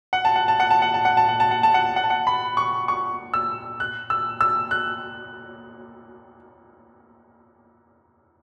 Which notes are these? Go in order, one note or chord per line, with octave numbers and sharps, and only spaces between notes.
F#5
A5
F#5
A5
F#5
A5
F#5
A5
F#5
A5
F#5
A5
F#5
A5
F#5
F#5
A5
F#5
B5
C#6
C#6
E6
F#6
E6
E6
F#6